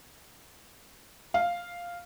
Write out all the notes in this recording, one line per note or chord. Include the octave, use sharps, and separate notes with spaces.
F5